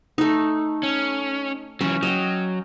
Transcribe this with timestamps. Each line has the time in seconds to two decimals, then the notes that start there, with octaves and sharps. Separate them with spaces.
0.18 A3 D#4
0.83 C#4
1.81 E3 F#3 C#4
2.03 F#3 D#5 G5